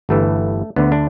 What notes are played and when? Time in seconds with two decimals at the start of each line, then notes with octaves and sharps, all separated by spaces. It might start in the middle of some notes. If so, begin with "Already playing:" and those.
0.09 G1 G2 E3 A3
0.76 D2 D3 B3
0.92 D4